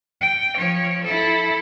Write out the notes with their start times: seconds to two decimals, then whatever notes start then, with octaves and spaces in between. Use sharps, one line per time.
0.21 G5
0.57 F3 C#5
1.05 E4 A4